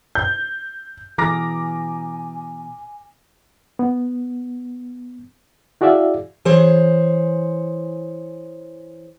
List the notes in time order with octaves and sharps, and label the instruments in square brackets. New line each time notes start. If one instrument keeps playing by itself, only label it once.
[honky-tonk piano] G6
[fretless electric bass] B2 E3 [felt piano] G#4 A#5 [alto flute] G#5 [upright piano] D6 F6 A#6
[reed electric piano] B3
E4 F#4 G#4 D5 E5 F5
[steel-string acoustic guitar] E3 G#4 C5 C#5